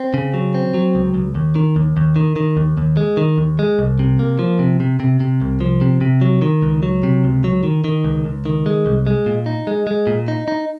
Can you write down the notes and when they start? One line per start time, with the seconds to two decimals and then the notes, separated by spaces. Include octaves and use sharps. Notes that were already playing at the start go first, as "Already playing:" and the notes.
Already playing: C4
0.14 C#3
0.34 F#3
0.54 C4
0.74 F#3
0.95 C#2
1.14 C#2
1.35 D#2
1.56 D#3
1.76 D#2
1.97 D#2
2.16 D#3
2.36 D#3
2.57 D#2
2.77 D#2
2.97 G#3
3.17 D#3
3.38 D#2
3.59 G#3
3.79 C2
3.99 C3
4.19 A#3
4.39 F3
4.59 C3
4.80 C3
5.00 C3
5.20 C3
5.41 C2
5.61 F3
5.81 C3
6.01 C3
6.21 F#3
6.42 D#3
6.62 C#2
6.83 F#3
7.03 C3
7.24 C#2
7.44 F#3
7.63 D#3
7.84 D#3
8.05 C#2
8.25 C#2
8.46 D#3
8.66 G#3
8.86 C2
9.07 G#3
9.26 A#2
9.46 D#4
9.67 G#3
9.87 G#3
10.07 A#2
10.28 D#4
10.48 D#4